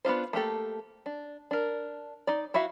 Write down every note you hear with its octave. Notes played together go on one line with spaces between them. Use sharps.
B3 D4 F4 C5
A3 A#3 G4 A4
D4
D4 A#4
D#4 D5
E4 F#4 E5 F5